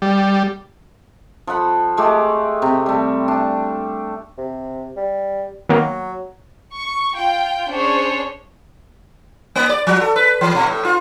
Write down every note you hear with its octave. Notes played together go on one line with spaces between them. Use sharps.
G3
F3 A4 F#5 B5
G#3 A3 G4 D6
C3
G3 A3
D4 A5
C3
G3
D#3 F#3 A#3 B3
C#6
F4 G5
C#4 D4 G#4 C5 C#5
A#3
D5
F3
A4
B4
E3
B2
A2
F4